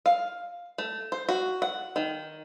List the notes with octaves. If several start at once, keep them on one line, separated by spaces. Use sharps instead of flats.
F5
A3
C5
F#4
F#5
D#3